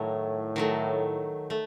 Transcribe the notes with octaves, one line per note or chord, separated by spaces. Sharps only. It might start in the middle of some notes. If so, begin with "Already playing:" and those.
Already playing: A2 D#3 F#3 A3
D#3 F#3 A3
A3